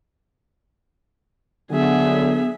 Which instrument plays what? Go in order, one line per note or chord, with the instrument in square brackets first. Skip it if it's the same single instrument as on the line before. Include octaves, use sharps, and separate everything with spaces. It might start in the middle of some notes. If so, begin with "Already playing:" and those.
[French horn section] D3 F#3 [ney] B3 [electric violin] G#4 E5